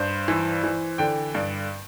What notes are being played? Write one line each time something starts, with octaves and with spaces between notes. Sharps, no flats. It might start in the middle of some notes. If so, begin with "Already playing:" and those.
Already playing: G2 C5
E3
E3
D3 G5
G2